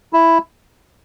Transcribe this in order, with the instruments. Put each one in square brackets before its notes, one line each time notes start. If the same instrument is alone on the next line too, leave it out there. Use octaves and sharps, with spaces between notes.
[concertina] E4